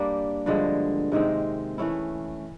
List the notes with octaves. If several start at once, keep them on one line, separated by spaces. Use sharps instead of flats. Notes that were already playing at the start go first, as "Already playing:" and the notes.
Already playing: G3 A#3 D4
G2 D3 F3 G#3
C3 D#3 G#3 C4
E3 A3 C#4 E4